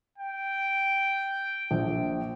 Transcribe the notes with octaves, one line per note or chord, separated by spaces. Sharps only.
G5
A#1